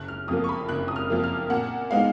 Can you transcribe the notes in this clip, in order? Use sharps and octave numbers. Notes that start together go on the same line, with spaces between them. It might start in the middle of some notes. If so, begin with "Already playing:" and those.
Already playing: F#1 F#6
F6
F2 F3 A#3 D#6
C#6
B5
F#1 F#6
D#6
F6
F2 F3 A#3
F6
A#2 F#5
G#3 B3 D#4 F5